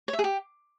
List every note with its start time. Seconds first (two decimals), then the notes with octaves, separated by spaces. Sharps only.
0.08 C#5
0.13 E5
0.19 G#4
0.24 G4